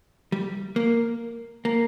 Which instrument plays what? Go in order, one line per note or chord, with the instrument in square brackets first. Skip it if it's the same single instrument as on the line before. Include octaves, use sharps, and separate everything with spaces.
[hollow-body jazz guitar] G3
A#3
A#3